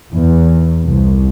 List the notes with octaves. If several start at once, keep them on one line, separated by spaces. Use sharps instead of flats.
E2
C2